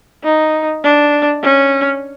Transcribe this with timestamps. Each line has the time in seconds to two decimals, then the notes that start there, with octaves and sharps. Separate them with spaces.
0.24 D#4
0.83 D4
1.43 C#4